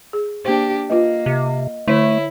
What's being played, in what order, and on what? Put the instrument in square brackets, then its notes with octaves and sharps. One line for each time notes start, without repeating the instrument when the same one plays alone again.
[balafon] G#4
[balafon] A#3 C5 [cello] D4 G4
[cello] A#3 [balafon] F4 B4 [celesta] D#5
[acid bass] C3
[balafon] D3 [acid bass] A3 [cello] E4 [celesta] C#5 E5